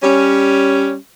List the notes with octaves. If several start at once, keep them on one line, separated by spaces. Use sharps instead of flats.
G3 C#4